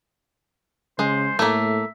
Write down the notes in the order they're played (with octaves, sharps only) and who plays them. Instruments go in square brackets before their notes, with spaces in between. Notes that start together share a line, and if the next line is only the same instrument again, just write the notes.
[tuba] C#3 [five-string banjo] G#3 [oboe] C5
[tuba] A2 [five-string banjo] A3 A#3 [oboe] E5